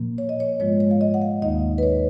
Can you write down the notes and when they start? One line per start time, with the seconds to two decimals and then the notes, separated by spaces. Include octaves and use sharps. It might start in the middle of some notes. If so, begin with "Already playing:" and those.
Already playing: A#2 F3 A#3
0.18 C#5
0.29 D#5
0.40 C#5
0.60 G#2 F3 G#3 B3 F4 C#5
0.80 C#5
0.91 F5
1.01 D#5
1.14 F#5
1.22 F5
1.42 D#2 D#3 A#3 D#4 D#5
1.78 B4
1.83 C#5